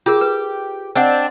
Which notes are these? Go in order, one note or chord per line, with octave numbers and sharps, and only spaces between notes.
F4 G4 G#4 A#4
B4
C4 D4 D5 D#5 F#5